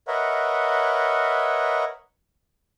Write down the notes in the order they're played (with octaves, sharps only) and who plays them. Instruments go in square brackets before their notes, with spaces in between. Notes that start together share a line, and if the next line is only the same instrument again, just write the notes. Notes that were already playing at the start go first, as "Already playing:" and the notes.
[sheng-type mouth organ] A#4 B4 C#5 D#5 E5 F#5